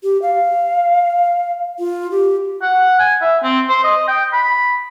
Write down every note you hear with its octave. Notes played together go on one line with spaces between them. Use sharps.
G4
F5
F4
G4
F#5
G#5
E5
C4
C5
D#5
G5
B5